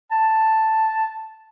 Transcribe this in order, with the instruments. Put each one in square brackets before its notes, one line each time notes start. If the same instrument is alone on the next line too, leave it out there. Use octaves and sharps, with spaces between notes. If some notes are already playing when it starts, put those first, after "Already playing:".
[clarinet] A5